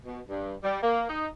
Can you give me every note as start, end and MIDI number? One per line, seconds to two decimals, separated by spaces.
0.05 0.20 47
0.29 0.53 43
0.63 0.78 55
0.82 1.08 58
1.09 1.28 63